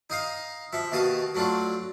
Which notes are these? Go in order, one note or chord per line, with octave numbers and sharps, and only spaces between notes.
D#4 D#5 F5
F3 E5
D#2 B2 F5 A5 D#6
F#3 A3 D4 F4